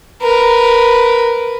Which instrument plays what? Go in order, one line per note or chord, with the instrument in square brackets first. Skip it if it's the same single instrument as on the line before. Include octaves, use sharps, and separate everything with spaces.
[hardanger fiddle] A#4 B4